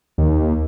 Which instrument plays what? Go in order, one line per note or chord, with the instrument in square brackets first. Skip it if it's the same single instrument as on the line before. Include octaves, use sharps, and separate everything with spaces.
[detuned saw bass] D#2